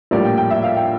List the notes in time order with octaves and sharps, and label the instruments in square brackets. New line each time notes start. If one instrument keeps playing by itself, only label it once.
[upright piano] A#1 A2 G3 A#3 D5
G5
G5
E5
F5
G5